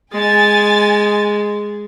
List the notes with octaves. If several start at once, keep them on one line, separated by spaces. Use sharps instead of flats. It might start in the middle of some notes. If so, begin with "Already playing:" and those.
G#3 G#5 A6